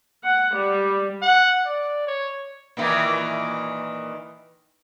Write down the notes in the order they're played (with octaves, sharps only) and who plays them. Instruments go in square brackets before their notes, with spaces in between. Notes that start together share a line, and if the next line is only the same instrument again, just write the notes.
[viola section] F#5
G3
[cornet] F#5
D5
C#5
[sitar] A#2 D#3 E3